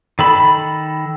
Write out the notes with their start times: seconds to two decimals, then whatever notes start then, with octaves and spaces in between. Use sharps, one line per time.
0.19 D#3 A4 B5